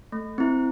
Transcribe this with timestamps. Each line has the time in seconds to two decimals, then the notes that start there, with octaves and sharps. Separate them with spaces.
0.12 A3
0.38 C4 E4